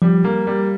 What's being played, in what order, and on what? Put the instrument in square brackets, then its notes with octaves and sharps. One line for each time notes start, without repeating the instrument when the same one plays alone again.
[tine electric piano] F3 [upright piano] G3
[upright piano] A#3
G3